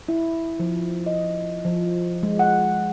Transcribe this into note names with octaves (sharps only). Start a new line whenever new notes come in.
E4
F3
D#5
F3
G#3
F#5